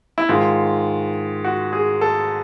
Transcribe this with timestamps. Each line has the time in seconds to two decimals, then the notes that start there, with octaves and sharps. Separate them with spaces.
0.18 E4
0.29 G#2 D#3 F4
1.45 F#4
1.73 G#4
2.01 A4